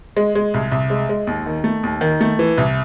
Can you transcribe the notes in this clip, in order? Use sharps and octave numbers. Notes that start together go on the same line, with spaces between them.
G#3
G#3
C2
C2
G#3
G#3
D#2
D#3
A3
D#2
D#3
A3
E3
C2